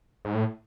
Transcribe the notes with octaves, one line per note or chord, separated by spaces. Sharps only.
G#2
A2